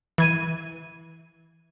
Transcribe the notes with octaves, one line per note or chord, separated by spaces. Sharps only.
E3 G#6 D#7